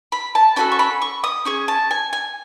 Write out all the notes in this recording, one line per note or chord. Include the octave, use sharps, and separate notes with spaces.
B5
A5
C#4 F#4 A4 B5
C#6
B5
C#6
D#6
C#4 G#4 C#6
A5
G#5
G#5